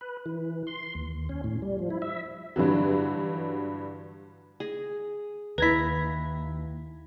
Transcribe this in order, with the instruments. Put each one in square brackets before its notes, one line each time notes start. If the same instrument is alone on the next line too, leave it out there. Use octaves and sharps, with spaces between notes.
[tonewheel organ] B4
E3
C6
D#2
C#4
A2
G3
F3
E4
E5
[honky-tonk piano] G2 D3 E3 F#3
[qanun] G#4
[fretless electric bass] D#2 [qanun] E4 A#5 [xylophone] B4 G#6 B6